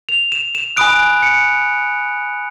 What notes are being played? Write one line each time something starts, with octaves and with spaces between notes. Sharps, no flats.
F7
E7
E7
G#5 B5 D#6 F#6 D7
C#7